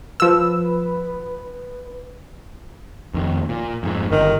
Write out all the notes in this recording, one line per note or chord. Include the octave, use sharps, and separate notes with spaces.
F3 B4 E6
F2 D#3
A#2
F2 G#2
G1 D#3